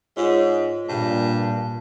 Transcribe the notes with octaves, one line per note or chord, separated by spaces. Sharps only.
G#2 F4 C#5 D#5
G2 A#2